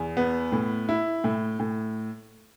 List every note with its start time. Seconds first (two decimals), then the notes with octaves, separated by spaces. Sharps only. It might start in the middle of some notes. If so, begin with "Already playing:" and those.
Already playing: E2
0.17 B3
0.52 A2
0.89 E4
1.24 A2
1.60 A2